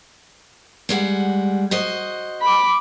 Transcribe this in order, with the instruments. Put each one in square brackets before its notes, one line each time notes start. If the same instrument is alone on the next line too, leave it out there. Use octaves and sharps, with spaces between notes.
[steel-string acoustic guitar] G3 G#3 F#5
F#4 C5 D#5
[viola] B5 D6